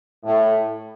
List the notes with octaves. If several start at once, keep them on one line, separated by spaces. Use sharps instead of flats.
A2